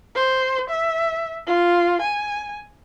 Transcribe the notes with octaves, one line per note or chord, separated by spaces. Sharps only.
C5
E5
F4
G#5